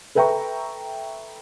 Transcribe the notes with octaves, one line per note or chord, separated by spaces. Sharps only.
A4 B4 E5 G5 A#5 C#6